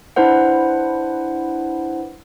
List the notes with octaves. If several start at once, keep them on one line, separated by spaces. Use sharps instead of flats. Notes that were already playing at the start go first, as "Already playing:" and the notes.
D4 E4 B4 C5 F#5